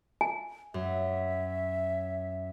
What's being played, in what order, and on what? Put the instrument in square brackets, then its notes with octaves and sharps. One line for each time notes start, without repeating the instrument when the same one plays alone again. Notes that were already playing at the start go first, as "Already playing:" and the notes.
[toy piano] G#5
[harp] F#2 [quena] E5